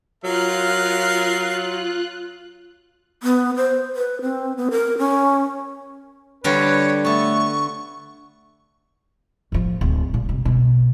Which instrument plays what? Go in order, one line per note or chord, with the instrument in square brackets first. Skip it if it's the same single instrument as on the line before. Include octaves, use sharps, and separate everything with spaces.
[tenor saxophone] F#3 [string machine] F4 F#6 [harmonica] A#4 F5
[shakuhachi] B3
C5
B4
C4
B3
A#4
C#4
[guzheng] D3 G3 F4 [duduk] B4 [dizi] C#5
[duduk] A3 [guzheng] B3 A4 [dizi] C#6
[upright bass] A2 F3
D1
A#2
F#2 C3
B2